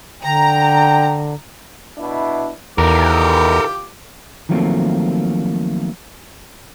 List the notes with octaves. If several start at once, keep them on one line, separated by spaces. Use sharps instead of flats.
D3 G5 A#5
B2 D4 E4
E2 D#3 E3 F4 G4 A4 A#4 D6
D#3 F3 F#3 A3 A#3 C4